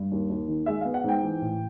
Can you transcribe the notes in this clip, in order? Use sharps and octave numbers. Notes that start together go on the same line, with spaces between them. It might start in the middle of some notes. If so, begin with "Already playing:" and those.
Already playing: G2
D#2
D#2
D#3
G#3 E5
B3 F5
F#5
G#2 G5
E3
A1